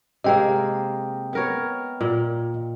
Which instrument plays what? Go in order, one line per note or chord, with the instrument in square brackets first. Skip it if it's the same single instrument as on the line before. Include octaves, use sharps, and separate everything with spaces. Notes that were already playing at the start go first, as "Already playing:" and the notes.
[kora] C3 G#3 A#3 [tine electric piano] D#5 G5
[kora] B3 A#4 C#5
A#2